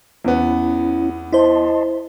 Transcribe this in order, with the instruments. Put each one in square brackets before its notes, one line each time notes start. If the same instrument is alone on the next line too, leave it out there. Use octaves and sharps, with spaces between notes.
[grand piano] E2 B3 [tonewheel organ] C#4 E4
[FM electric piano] E4 C5 [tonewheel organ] D#5 A5 C6